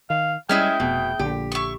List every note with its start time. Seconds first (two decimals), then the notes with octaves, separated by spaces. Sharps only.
0.10 D#3 F5
0.49 G3 G#3 C#4 E4 G#4 E5 G5 F6
0.80 F1 B2
1.19 A#1 D3 G4
1.52 E4 C#6